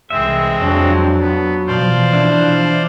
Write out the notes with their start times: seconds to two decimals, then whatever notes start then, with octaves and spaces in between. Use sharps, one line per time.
0.10 C2 E3 G#3 C4 E5
0.61 F2 F#3 D4
1.20 B3
1.67 B2 E3 F3 C5 D5 F5
2.13 D4 E4